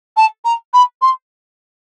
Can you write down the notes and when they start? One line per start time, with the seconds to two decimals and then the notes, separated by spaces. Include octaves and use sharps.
0.17 A5
0.45 A#5
0.73 B5
1.02 C6